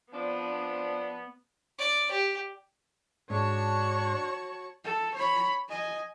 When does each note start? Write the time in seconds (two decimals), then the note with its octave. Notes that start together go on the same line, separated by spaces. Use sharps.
0.13 F3 B3 C4 D4
1.79 D5
2.11 G4
3.30 G#2 D4 F#4 C#5 A5 C#6
4.84 A4
5.15 C#5 B5
5.69 D#5 G#5